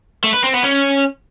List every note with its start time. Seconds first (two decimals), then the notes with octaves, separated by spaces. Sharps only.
0.24 A3
0.34 B4
0.44 C4
0.54 B3
0.64 C#4